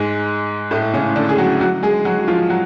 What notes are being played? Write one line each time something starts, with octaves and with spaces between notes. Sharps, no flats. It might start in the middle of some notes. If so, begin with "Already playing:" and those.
Already playing: G#2 G#3
A2 A3
C#3 C#4
D3 D4
G#4
F#3 F#4
F#3 F#4
G#3 G#4
F#3 F#4
F#4
F3 F4
F#3 F#4